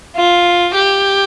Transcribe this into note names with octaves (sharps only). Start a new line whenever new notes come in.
F4
G4